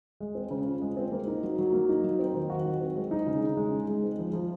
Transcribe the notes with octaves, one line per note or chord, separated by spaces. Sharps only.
G#3
C4
C#3
F4
G#3
C4
A#3
D#4
F#3
F#3
A#3
D#4
F#3
C4
D#3
F#4
F#3
C4
G#3
D#4
C#3
C#3
G#3
D#4
G#3
C4
F3
F3